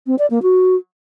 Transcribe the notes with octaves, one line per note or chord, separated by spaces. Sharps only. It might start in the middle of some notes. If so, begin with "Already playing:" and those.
C4
D5
A#3
F#4